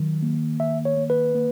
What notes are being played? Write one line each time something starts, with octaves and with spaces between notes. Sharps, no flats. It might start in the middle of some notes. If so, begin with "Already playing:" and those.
Already playing: D#3 F#3
A#3
D#3 E5
C#5
A#3
B4
A#3